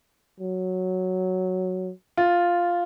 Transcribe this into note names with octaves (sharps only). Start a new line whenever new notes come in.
F#3
F4